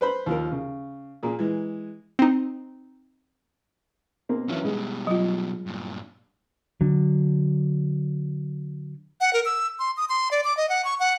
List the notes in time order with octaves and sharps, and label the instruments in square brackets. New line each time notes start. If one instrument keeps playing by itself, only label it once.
[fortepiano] B4 C5 B5
D#2 F3 A#4
C#3
A#2 A#3 G#4
E3 G#3
[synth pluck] C4 D#4
[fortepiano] B2 A#3 C4
[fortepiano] F#2 E3 C#4 [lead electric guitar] F#3 F4
[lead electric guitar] B2 G3 [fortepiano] G#3
[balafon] F#3 F4
[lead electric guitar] G2 A#2
[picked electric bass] D3 F#3
[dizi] F#5
A#4
E6
C6
D#6
C6
D5
D6
D#5
F#5
C#6
F#5